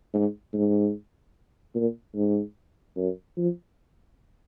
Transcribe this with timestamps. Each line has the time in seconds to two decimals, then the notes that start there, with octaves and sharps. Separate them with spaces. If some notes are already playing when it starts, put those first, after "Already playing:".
0.14 G#2
0.53 G#2
1.75 A#2
2.15 G#2
2.96 F#2
3.37 F3